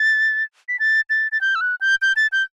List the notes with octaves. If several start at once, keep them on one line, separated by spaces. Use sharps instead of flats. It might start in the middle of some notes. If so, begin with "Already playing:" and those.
Already playing: A6
B6
A6
A6
A6
G6
E6
F#6
G6
G6
A6
G6